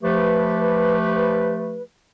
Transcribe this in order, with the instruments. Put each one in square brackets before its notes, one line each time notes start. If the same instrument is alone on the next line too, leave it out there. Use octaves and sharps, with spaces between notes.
[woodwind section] F3 A3 G4 B4